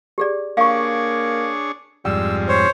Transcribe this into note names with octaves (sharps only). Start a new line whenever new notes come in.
G4 G#4 D5
A#3 D4 G#4 C#5 F5 C#6
F2 G#2 G3 G5 E6
C5 C#5